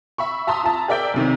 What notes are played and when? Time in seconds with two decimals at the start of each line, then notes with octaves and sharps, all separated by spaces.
0.18 E5 B5 C#6
0.47 E5 A5 A#5 C6 D#6
0.63 F4 E5 A5 A#5
0.88 G#4 A#4 D5 E5 G5
1.14 B1 C3 D#3